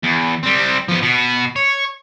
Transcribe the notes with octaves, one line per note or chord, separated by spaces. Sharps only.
E2
G3 C4
F3 B3
B2 B3
C#5